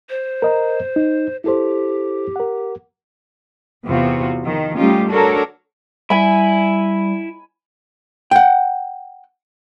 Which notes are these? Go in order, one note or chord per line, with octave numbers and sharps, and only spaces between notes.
C5
A#4 D#5 A#5
D#4
E4 G4 A4 C5
A#4 F#5
E2 C3 B3 F4 F#4
D#3 F3
G3 A3 C#4 D#4 F4 G4
D4 F#4 A4 A#4 C#5
G3 E4 G#5 B5
F#5 G5